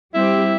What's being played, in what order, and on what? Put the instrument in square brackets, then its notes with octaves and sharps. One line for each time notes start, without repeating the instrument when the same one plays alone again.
[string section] G3 C4 G4 [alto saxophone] E4